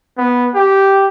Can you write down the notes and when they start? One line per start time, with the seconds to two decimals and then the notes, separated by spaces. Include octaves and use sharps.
0.18 B3
0.55 G4